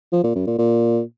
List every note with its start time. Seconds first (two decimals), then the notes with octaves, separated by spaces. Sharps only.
0.12 F3
0.24 A#2
0.35 F#2
0.47 A#2
0.58 A#2